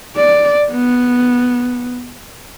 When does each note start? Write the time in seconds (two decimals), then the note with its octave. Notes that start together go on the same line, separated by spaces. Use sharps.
0.16 D5
0.70 B3